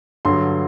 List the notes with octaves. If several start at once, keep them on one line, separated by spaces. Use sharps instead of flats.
G2 D3 F#3 C6